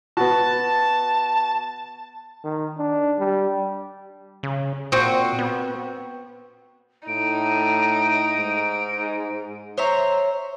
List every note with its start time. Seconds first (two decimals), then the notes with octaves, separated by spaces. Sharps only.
0.17 B3 F#4 A5
2.44 D#3
2.78 D4
3.19 G3
4.43 C#3
4.92 A#2 C4 F#4
5.39 B3
7.08 A2 D#4 D7
8.36 G#2
9.77 C5 C#5 E5 A#5